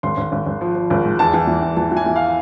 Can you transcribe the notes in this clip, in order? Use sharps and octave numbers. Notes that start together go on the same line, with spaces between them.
G#1 C6
G#1
G#1
G#1
F3
F3
G#1
G#2
E2 A5
E2
E3
E2
E3 A5
E3 G#5
E3
F5